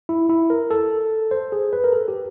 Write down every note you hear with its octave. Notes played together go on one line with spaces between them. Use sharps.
E4
E4
A#4
A4
C5
G#4
B4
A#4
A4
G4